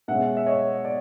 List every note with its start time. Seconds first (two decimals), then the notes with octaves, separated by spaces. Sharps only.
0.08 B2 G#3 C#4 E5 F#5
0.37 E5
0.46 C#5 D#5
0.85 D5